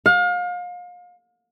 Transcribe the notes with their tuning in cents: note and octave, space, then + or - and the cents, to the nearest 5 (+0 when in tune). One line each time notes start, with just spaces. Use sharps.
F5 +35